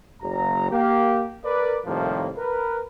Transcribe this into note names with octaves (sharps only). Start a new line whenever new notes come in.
F#1 A#5
A#3 G4
A#4 B4 D5
C2 A2 C3 D#3 F3 A#3
A#4 B4